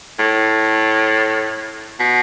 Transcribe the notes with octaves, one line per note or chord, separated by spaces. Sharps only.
A2
B2